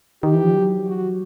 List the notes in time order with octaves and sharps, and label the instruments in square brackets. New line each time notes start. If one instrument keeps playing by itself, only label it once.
[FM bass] D#3 [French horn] G4
[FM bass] E3
F3
F#3
[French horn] F#4